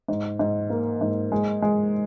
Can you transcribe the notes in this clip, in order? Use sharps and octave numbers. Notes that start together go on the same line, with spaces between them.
G#2
G#2
A#3
G#2
G#3
G#3